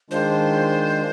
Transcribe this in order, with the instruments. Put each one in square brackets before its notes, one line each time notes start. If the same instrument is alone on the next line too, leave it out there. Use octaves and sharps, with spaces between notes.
[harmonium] D#3 G#3 D4 F4 [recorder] C5